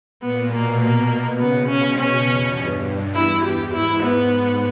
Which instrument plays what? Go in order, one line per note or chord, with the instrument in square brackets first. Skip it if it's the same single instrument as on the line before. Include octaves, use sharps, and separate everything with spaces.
[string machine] A#2 [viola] B3
[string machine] B2 [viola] A#3
[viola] A#3
[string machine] C#3 [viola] B3
[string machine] B2 [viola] C#4
[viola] C#4
[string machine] E2
G2
[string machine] E2 [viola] E4
[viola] G4
[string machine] G#2 [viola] E4
[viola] B3
[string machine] G#2